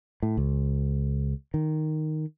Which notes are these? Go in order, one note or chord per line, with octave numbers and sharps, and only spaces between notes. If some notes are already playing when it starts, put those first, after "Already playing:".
A2
C#2
D#3